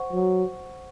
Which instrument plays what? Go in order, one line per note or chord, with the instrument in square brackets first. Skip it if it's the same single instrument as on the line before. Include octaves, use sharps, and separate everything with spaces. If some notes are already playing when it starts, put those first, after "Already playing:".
Already playing: [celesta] C5 F#5 C#6
[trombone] F#3